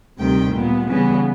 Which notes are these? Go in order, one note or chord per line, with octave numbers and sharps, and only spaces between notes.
D2 C3 D#3 G3 G5
A#2 G3 B3
C#3 E3 G3 B3